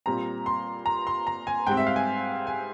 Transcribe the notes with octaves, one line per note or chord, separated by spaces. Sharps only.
A#2 G3 C4 A#5
C6
A#5
C6
A#5
G#5
G#2 G3 C4 G5
E5
F5
G#5
G#5